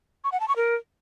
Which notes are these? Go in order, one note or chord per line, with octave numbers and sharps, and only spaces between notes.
C#6
F#5
A5
C#6
A#4